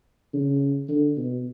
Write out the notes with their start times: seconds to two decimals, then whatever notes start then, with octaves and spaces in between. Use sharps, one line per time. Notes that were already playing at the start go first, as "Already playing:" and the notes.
0.33 C#3
0.89 D3
1.17 B2